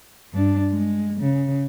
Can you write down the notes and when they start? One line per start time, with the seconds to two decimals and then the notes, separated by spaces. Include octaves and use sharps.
0.34 G2 D4
0.71 G#3
1.21 C#3